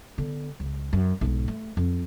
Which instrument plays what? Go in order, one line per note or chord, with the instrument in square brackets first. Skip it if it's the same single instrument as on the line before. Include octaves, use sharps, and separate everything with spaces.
[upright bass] D3 B3
C#2
F#2
B1 G#2
A3
F2